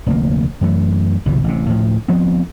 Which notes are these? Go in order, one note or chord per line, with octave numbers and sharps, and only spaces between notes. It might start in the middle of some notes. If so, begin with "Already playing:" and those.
F1 D2 A#3
F#2 E3 A3
G1 C2 B2 E3
A1 C3
D2 A2 F3
D2 F3 B3 C4